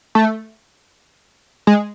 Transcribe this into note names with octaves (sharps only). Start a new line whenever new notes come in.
A3
G#3